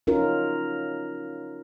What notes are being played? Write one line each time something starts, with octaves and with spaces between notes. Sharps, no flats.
C#4 D#4 F4 F#4 A#4